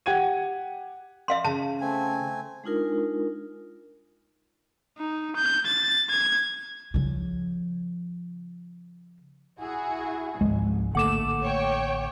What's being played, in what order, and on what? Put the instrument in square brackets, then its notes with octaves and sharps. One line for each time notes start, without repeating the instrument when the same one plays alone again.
[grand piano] G4 F#5 G#6 D#7
[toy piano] E5 F5 C6
[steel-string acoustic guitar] C#3 [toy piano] A5
[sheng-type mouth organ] A3 C4 G#5
[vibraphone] G#3 D4 D#4 F4 A#4
[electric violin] D#4
G6
A6
G#6
[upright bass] C#3 F3
[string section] E4 F#4 G#4
[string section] G#1 [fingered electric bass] C#2 C#3 F3 [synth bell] G#3
[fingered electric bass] A1 D3 A#3 [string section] A3 [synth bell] F#5 D6 E7
[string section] C#5 G5